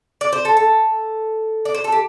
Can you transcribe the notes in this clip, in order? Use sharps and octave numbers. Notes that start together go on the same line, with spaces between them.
D5
C5
A4
A4
D5
C5
A4
G4